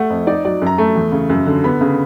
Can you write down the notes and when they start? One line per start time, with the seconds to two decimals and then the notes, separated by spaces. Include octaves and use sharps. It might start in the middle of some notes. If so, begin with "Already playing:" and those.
Already playing: A3 F#5
0.10 F2
0.27 D#4 D5
0.45 F#3 D5
0.62 F#2 A#5
0.78 A3 A5
0.96 E2
1.12 C#3
1.30 F#2
1.47 D3
1.64 B3 B5
1.81 C#3